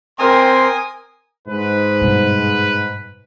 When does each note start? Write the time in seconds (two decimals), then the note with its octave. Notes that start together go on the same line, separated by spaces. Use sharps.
0.19 C4 A#4 G5 G#5 C6 D#6
1.48 G#2 B4
2.01 G2 B2